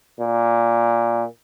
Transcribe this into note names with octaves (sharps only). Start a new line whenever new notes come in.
A#2